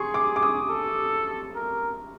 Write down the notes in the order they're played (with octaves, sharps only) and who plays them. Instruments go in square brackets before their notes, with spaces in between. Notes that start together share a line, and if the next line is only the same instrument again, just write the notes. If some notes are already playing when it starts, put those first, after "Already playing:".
Already playing: [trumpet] G#4 [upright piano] C6 C#6
[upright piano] D6
D6
D#6
[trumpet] A4
A#4